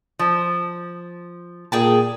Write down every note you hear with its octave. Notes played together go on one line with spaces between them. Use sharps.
F3
A#2 G#4 G5 A5